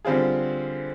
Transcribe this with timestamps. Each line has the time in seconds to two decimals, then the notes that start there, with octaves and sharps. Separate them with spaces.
0.05 D3 G3 C4 F4 G#4